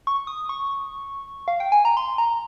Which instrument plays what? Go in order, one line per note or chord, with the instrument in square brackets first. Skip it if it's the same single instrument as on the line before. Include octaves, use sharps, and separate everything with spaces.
[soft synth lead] C#6
D#6
C#6
F5
G5
G#5
A#5
C6
A#5